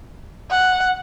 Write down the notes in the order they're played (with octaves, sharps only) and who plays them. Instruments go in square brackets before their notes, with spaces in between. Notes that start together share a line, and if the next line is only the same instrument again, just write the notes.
[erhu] F#5